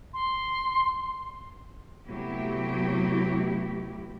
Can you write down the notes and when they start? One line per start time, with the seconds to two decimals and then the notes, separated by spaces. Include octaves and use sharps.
0.14 C6
2.06 C3 F#3 A3 B3 E4 G4